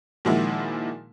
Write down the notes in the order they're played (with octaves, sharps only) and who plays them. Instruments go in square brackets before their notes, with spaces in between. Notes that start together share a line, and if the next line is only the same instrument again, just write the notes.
[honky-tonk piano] A#2 D#3 F3 G#3 E4 F#4